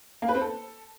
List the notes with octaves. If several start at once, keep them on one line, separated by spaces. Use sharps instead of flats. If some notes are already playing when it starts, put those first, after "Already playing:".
A#3
B4
C4
A4